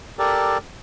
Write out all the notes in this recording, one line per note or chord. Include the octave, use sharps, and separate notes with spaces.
G4 A4 A#4 D5